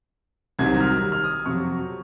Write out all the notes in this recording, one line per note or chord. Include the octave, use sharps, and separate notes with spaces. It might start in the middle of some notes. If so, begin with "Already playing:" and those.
C2 C3 D#3 F#3 G#6
F6
F6
D#6
F2 C3 F#3 C#6